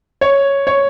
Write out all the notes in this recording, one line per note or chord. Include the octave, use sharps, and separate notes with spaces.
C#5
C#5